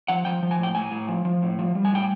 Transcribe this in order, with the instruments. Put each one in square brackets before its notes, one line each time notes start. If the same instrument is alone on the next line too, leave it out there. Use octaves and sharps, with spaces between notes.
[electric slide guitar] F3 F#5
F3 G5
F3
G#5
A2 G5
A2 G#5
A2
F3
F3
A2
F3
G3
G#5
A2 G5